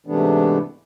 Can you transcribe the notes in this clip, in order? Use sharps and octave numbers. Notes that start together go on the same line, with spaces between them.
G#2 C3 E3 A3 B3 D4